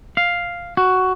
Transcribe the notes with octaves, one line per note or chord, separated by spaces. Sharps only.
F5
F#4